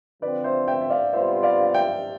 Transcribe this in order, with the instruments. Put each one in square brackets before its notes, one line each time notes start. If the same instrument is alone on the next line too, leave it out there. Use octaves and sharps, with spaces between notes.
[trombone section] D3 F3 C4 [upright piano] B4 D5
[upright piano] C5 E5
E5 G5
E5
D5 F5
[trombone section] C3 G3 B3 F4 [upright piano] C5 E5
[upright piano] D5 F5
E5 G5